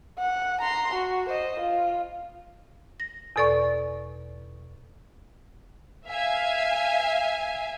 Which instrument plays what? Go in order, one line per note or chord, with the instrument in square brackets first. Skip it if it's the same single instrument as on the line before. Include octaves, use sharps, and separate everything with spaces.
[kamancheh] F#5
A#5 C6
F#4
C5 D#5
F4
[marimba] A#6
E2 B2 A4 D5 C#6
[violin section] E5 F5 G#5